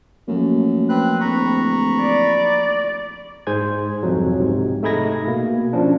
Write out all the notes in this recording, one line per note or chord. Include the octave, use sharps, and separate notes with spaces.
F#2 F3 A3 A#3
C4 B4 F#6
D1 A#5 B5 C#6
D5
G#2 G#4 C5 G#5 G#6
C2 F2 F#3
G#2 C3
A3 D#4 G#4 B5 G#6 A#6
B2 A#3
F3 C#4 D4